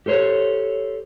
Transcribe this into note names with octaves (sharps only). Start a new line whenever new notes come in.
G4 A4 C5 C#5